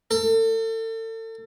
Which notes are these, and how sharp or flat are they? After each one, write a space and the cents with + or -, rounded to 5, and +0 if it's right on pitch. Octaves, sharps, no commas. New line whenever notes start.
A4 +35